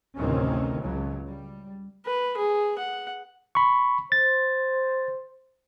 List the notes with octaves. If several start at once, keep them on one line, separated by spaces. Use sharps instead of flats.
A1 D2 C3 D#3 C4 C#4
C#2 C#3 F#3
G3
B4
G#4
F#5
B5 C#6
C5 A6